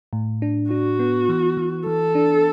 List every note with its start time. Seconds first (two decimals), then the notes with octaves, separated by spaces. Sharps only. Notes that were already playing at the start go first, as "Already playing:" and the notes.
0.13 A2
0.42 D4
0.71 D4 F#4
0.99 B3
1.29 E3
1.57 E3
1.87 E3 A4
2.15 D4